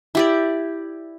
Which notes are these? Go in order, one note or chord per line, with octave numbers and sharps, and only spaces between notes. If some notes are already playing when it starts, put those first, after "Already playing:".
E4 G4 D5